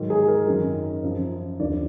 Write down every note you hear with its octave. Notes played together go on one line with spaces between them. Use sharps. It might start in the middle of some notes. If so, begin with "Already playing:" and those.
Already playing: G#2 D#3 F#3
G#4
A#4
F#2 D#3 F#3
F#2 F3
D#2 D3 F3 D5